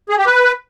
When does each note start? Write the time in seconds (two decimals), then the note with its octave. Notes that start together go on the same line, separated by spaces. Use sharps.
0.09 G#4
0.18 G4
0.26 B4